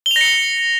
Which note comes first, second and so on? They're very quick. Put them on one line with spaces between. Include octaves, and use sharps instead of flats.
G7 F7 A#6 C#7